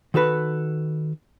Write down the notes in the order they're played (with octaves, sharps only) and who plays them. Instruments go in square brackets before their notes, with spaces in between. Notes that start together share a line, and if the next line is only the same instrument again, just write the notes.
[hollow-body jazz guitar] D#3 F#4 A4 B4